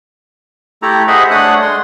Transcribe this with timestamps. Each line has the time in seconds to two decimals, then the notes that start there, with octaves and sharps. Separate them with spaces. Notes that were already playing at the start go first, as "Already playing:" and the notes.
0.82 A3 E4 G4 A4 A#5
1.08 G#4 C5 D#5 E5 F#5 B5
1.31 A3 D4 C#5 F#5 D#6 F#6
1.62 G#3 C6